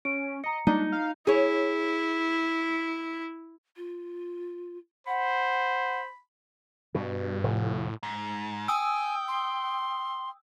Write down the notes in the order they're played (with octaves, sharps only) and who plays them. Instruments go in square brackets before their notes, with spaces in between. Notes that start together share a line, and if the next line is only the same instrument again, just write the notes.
[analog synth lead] C#4 [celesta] D7
[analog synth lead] D#5 [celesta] A#5 C#7
[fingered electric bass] G3 G#3 A#3 [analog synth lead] D4 [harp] D#4
[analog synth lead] F5
[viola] E4 [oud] G#4 C#5
[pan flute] F4
[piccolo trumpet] C5 [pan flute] F#5 [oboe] B5
[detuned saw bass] G2 [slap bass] B2
[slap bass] F1 [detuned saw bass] A2
[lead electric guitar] G#2
[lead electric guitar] G5 [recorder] G#5 [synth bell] D#6 E6
[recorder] C6